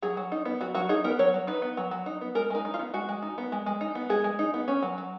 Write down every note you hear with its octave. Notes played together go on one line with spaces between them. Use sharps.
F#3 G#4
F#3
D#4
B3
F#3 F#4
F#3 F#4
D#4 G#4
B3 A#4
F#3 C#5
F#3
D#4 B4
B3
F#3
F#3
D#4
B3
G#3 A#4
G#3 D#4
D#4
F4
B3
G#3 F#4
G#3
D#4
B3
G#3
G#3
D#4
B3
G#3 G#4
G#3
D#4
B3
C#4
F#3
F#3